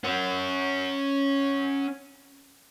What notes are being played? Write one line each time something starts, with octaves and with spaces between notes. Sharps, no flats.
C#4 F#5